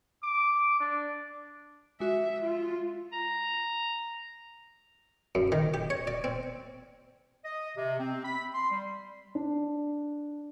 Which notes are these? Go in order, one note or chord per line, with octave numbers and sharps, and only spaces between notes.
D6
D4
G#3 F#4 E5
F4
A#5
F#2
D#3
G4
C#5
D5
C4
D#5
C3
C4
B5
C6
G3
D4